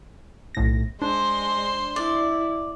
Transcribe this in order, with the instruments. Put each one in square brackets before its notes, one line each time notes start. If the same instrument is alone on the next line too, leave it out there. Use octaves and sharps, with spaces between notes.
[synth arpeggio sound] B1 A2 A#6
[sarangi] G#3 [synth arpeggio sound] D4 [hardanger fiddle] C5 C6
[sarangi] E4 [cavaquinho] D5